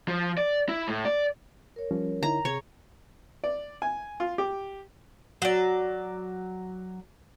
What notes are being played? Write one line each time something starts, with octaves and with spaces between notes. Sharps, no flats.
F3
D5
E4
A2
D5
A#4 C#5
F3 G3 C#4
D3 D#4 E4 A#5
C3 G#4 C#5
D5
G#5
F4
G4
F#3 D5